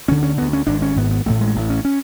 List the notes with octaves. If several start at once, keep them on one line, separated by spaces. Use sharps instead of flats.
D2 D3 C#4
C#4
D2 D3 B3
C#4
G#1 G#2 D4
C#4
G#1 G#2 B3
B3
A1 A2 A3
G#3
A1 A2
C#4
C#4